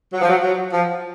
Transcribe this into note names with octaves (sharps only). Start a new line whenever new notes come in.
F#3
F3
F#3
F#3
F3